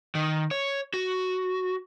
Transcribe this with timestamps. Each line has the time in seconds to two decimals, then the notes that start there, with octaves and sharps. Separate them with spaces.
0.15 D#3
0.51 C#5
0.94 F#4